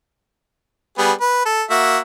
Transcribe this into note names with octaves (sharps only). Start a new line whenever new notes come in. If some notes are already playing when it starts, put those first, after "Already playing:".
G3 B3 G#4
B4
A4
A#3 F#4 E5